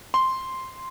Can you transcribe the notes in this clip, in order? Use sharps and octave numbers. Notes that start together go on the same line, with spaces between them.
C6